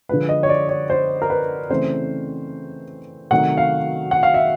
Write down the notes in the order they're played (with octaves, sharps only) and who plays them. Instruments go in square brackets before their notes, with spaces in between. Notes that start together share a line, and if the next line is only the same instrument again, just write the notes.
[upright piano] D3 F3 G#3 B4
D#5
C#5
D5
C#5
C5
A#4
B4
C#3 E3 A3 C4 C5
C3 D#3 F#3 A3 F#5
F5
F#5
F5
E5